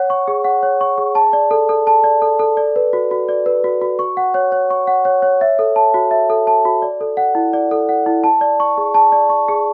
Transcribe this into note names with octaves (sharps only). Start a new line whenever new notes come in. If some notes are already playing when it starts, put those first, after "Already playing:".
Already playing: C#5 F#5
C#6
G#4
F#5
C#5
C#6
G#4
A5
D5
A4
A4
A5
D5
A4
A4
D5
B4
F#4
F#4
D5
B4
F#4
F#4
C#6
F#5
C#5
C#5
C#6
F#5
C#5
C#5
E5
A4
A5
F#4
E5
A4
A5
F#4
D5
A4
F#5
E4
D5
A4
F#5
E4
A5
D5
C#6
G#4
A5
D5
C#6
G#4